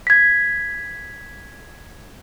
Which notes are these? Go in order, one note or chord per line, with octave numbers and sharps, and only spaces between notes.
G#6 B6